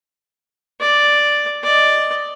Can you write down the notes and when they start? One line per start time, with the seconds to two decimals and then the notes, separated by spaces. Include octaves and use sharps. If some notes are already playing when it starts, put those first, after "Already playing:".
0.80 D5
1.63 D5 D#5